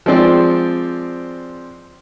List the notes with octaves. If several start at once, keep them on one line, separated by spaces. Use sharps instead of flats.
F3 G#3 C4 D5